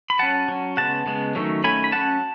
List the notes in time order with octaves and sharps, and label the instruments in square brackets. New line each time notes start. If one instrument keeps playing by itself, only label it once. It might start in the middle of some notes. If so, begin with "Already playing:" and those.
[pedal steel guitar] B5
F#3 C#4 F#5 A5
F#3 C#4
C#3 G#3 B3 F#5 A5
C#3 G#3 B3
D#3 F#3 A3 C#4
D#3 F#3 A3 C#4 G#5 B5
B5
F#3 C#4 F#5 A5